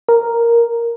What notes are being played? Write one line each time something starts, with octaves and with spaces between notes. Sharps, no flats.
A#4